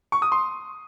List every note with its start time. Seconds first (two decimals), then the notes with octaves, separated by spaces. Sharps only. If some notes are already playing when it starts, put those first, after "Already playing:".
0.12 C#6
0.22 D#6
0.32 C6